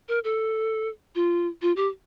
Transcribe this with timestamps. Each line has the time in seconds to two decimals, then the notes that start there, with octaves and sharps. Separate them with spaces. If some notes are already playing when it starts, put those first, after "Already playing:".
0.08 A#4
0.24 A4
1.15 F4
1.62 F4
1.76 G4